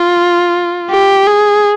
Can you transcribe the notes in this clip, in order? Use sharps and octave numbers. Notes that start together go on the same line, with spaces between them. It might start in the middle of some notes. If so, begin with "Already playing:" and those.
Already playing: F4
G4
G#4